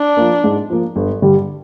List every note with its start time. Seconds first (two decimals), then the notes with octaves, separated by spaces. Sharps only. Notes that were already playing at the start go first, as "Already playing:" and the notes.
Already playing: D4
0.17 F3 A#3
0.44 G#2
0.70 F3 A#3
0.96 G1
1.22 G2 D3 G3